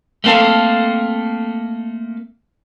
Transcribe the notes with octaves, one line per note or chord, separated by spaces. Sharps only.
A3 A#3 C4 A4 F5